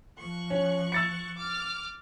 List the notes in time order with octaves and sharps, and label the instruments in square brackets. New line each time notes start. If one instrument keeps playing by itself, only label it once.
[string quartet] F3 C#6 F#6
[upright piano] C#4
E6 A6 C#7
[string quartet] D6 F6